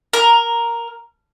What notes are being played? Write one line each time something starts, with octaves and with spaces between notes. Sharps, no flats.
A#4